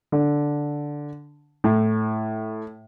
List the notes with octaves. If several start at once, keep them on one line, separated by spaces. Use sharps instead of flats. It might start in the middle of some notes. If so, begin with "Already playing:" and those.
D3
A2